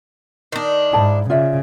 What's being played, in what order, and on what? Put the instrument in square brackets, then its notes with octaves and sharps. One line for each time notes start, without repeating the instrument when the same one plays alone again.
[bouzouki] D#3 D4
[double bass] G#2 [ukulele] E4 A5 B5
[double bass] C#3 [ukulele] F4 D5 E5